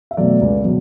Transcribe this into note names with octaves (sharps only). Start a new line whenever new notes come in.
E5
B2 F#3 A3 D5
C#2
B2 F#3